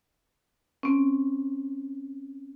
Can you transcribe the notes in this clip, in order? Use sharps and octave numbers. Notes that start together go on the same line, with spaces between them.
C4 C#4